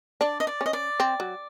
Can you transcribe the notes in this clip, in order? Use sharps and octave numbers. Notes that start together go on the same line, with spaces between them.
D4 D5
D#5
D5
C#4
D#5
D5
C4
F#3